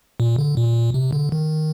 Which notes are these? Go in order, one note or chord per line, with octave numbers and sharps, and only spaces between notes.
A#2
D3
A#2
C3
D3
D#3